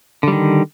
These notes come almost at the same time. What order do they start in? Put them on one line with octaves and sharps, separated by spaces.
D3 G3 D#3